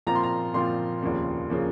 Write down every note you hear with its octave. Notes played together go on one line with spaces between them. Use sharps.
A#2 F3 C4 F4 A#5
C6
A#5
A#2 F3 C4 F4 C6
F1 D#2 C#3 F3 A#3
C#3 F3 A#3